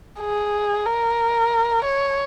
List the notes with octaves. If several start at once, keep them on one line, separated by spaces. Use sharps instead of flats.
G#4
A#4
C#5